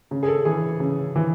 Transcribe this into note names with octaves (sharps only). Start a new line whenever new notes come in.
C#3
G#4
A4
E3 G#4
C#3
E3